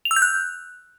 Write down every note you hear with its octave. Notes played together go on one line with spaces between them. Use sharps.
F7
E6
G6
F#6